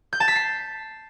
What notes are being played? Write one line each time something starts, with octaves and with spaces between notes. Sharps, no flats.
G6
A5
B6
C7